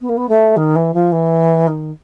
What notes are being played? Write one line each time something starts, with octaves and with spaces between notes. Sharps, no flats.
B3
A#3
B3
A3
D#3
E3
F3
E3
D#3